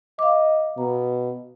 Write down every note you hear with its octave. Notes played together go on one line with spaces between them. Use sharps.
D#5 F5 D6
B2 A#5